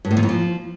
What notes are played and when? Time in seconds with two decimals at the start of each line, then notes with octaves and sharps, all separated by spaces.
0.05 G2
0.11 A2
0.17 E2
0.23 F2
0.29 F3